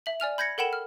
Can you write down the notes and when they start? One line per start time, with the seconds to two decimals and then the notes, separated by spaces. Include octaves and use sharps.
0.06 E5 F#7
0.20 D5 G#5 F6 F7
0.38 B5 G6 G#6 A#6 C#7
0.58 A4 A#4 F#5 G5 B5 E7
0.73 F6